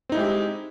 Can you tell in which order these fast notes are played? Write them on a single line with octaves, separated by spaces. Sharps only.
C4 D#4 E4 G#3 G4